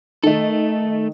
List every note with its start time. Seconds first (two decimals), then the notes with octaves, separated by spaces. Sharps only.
0.24 D#3 A3 D#4 A4